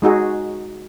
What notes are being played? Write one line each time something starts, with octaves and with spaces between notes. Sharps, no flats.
G#3 D#4 F#4 G#4